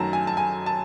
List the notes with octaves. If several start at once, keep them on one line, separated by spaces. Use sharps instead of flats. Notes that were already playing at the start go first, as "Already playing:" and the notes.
Already playing: F#2 D#3 F#3 A3 A5 A#5
G#5
A5
G#5
A5